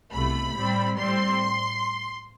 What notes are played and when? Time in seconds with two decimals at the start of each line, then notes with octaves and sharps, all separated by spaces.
0.13 C2 B2 A3 B5
0.55 A2 G3 C4
0.97 A2 G3 C4 C6